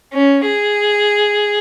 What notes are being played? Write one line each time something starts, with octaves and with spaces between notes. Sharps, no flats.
C#4
G#4